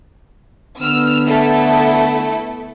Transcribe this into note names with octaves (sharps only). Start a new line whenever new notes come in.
D3 B3 E6 F6
A3 E4 A4